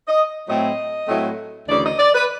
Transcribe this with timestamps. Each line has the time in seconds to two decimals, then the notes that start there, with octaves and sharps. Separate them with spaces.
0.08 D#5
0.48 A2 F#3 A3 C4 E4 D#5
1.08 A2 F#3 A3 C4 E4
1.69 D2 C#3 E3 D5
1.84 D#5
1.99 D5
2.14 B4